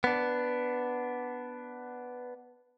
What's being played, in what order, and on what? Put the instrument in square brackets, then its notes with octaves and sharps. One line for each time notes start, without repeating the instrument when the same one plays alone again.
[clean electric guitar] B3 D4